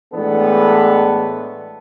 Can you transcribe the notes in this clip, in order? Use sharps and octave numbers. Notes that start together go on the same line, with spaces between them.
A2 E3 G#3 B3 D4 A4